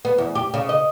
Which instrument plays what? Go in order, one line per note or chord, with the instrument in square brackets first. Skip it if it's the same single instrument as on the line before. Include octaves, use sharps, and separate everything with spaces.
[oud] B3
E2
G4
C#3
D#5